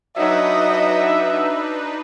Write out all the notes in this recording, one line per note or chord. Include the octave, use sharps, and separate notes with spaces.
F#3 D4 D#4 B4 D#5 E5